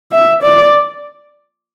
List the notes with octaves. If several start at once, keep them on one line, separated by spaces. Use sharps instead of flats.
E5
D5